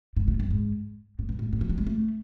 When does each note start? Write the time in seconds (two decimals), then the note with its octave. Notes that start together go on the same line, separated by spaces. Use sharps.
0.17 G#2
0.28 A2
0.40 F#2
0.50 G#2
1.19 A2
1.29 B2
1.39 A2
1.53 A2
1.61 E3
1.69 F#3
1.78 G#3
1.87 A3